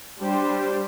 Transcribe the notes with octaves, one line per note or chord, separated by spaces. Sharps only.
G3 D4 G4 C5